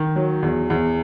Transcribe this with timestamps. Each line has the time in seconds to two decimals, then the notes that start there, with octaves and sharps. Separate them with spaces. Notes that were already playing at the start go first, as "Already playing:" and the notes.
Already playing: D#3
0.16 F#3
0.43 E2
0.70 E2